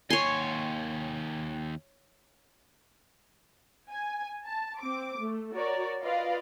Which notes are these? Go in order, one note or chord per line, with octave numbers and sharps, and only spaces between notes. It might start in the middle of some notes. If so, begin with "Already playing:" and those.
D#2 C#5 G#5 C6
G#5
A5
C4 D6
A3
F#4 A#4 C#5 D5
F4 B4 D5 D#5 F5